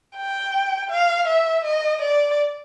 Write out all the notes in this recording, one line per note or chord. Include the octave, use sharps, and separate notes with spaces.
G5
F5
E5
D#5
D5